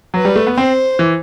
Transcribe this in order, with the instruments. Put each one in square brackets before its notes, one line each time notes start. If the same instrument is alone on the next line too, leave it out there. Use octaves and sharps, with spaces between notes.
[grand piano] F#3 [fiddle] B4
[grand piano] G3
A3
B3
[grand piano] C4 [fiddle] C5
[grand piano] E3